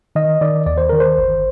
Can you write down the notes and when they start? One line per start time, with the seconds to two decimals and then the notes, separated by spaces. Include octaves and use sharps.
0.15 D#3 D#5
0.41 D#3 D5
0.66 D#2 D5
0.78 C5
0.89 D#3 A#4
1.00 C5
1.18 G1